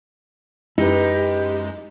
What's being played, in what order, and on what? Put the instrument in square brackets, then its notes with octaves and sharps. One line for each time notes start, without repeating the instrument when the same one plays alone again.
[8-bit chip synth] F#2 G#3 [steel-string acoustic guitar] D#4 [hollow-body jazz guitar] E4 B4 [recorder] G4